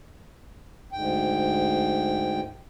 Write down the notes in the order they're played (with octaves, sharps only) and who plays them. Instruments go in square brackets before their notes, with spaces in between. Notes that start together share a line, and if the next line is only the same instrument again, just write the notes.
[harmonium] D2 G#2 G5